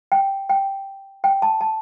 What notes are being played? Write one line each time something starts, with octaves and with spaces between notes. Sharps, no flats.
G5
G5
G5
A5
A5